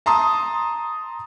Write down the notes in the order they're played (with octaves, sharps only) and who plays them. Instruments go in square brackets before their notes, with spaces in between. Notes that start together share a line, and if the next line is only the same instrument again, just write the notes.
[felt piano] A5 A#5 C6 D#6